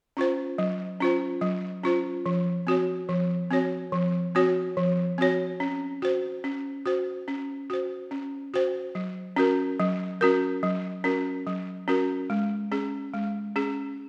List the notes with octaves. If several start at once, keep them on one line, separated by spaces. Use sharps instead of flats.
C#4 F4 C5
F#3
C#4 F4 C5
F#3
C#4 F4 C5
F3
C4 F#4 C#5
F3
C4 F#4 C#5
F3
C4 F#4 C#5
F3
C4 F#4 C#5
C#4
F#4 C5
C#4
F#4 C5
C#4
F#4 C5
C#4
F#4 C5
F#3
C#4 F#4 A#4
F#3
C#4 F#4 A#4
F#3
C#4 F#4 A#4
F#3
C#4 F#4 A#4
G#3
C#4 G#4
G#3
C#4 G#4